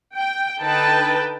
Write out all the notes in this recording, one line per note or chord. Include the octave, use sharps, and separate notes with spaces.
G5
D3 D#4 B4 G5 A5